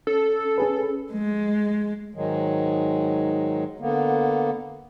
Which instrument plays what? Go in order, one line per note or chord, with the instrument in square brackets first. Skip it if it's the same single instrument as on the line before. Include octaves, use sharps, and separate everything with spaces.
[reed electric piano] C#4 [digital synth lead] A4
[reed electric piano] C#4 G#4 B4
[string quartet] G#3
[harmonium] G#2 D#3 F#3 G#3
D3 A#3 B3